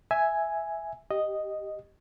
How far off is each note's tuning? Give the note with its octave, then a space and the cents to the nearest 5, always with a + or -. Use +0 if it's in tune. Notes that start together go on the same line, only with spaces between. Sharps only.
E5 +0 G#5 +0
G4 +0 D#5 +0